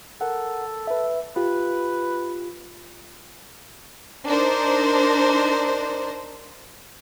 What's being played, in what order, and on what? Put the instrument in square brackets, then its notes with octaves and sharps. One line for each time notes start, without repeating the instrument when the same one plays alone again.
[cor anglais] A4 [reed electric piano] A#4 F#5
[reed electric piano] B4 E5
[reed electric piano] F4 G4 [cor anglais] B4
[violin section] D4 D#4 A#4 C5